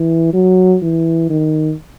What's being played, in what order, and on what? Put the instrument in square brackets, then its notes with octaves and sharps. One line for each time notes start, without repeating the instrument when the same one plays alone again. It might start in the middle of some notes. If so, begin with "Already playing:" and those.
Already playing: [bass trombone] E3
F#3
E3
D#3